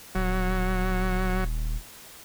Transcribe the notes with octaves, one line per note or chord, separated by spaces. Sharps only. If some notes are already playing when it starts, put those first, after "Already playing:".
D#1 F#3